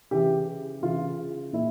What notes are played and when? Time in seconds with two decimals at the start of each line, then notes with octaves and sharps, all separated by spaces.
0.11 C#3 E3 G4
0.82 C#3 E3 F4
1.53 A#2 E4